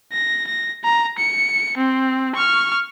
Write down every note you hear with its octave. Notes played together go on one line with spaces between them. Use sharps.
A#6
A#6
A#5
C#7
C4
C#6 F6